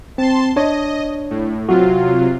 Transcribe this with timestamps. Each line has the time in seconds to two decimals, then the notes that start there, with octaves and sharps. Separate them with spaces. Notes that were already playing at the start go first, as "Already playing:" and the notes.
0.18 C4 A5 C6
0.56 D4 C#5 D#5
1.30 A2
1.69 C3 F#3 F4 F#4